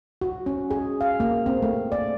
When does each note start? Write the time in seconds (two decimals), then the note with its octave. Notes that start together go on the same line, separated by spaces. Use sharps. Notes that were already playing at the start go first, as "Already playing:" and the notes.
0.21 F#4
0.46 C#4
0.71 G#4
1.01 F5
1.20 A#3
1.46 C4
1.63 A3
1.92 D5